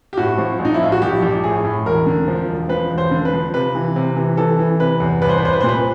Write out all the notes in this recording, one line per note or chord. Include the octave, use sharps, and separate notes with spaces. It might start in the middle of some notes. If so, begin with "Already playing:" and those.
G4
A2 F#4
F3
A#1
D#4
E4
A2 F4
F#4
A#1 G4
A#1
A2 G#4
A2
E1 A#4
D3
F3
E1
F3 B4
E1
C5
D3
B4
F3
C3 B4
E3
C3
E3
E3 A4
E3
C3 B4
E2
C2 B4
C5
B4
C2 C5
B4
A#2 C5
B4